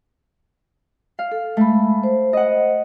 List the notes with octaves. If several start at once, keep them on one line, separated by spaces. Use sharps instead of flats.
F5
A4
G#3 A3 B5
C5
D#5 F#5